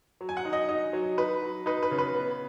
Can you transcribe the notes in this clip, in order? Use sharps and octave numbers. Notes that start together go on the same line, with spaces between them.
F#3
G#5
F#5
D#4
D#5
D#4 D#5
F#3
D#4 B4
F#3
D#4 B4
B4
C#3
B4
B3